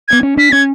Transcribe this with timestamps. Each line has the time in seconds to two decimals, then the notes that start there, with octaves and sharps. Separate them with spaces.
0.08 B3 G#6
0.23 C#4
0.37 D4 B6
0.52 C#4 G#6